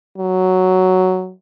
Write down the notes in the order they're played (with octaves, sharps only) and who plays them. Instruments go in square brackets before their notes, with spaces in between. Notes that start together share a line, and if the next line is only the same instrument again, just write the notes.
[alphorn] F#3